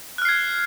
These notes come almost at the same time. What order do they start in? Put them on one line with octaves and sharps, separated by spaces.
F#6 F6 C7 G#6